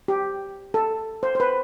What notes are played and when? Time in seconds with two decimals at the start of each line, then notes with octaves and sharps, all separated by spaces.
0.08 G4
0.74 A4
1.23 C5
1.35 C5
1.40 B4